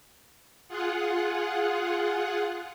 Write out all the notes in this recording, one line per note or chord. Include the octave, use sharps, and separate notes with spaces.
F4 G#4 F#5